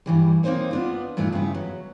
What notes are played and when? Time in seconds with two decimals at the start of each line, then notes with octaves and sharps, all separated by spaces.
0.06 G2 E3 G3
0.43 A#3 C4 C#4 D#4 C5 C#5
0.71 B3 D4 F4
1.17 G2 A#2 A3 D4 D#4
1.33 G2 C#3 B3 E4
1.54 F#3